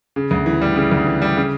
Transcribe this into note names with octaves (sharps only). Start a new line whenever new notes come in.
C#3
D2
E3
G3
C#3
D2
E3
G3
C#3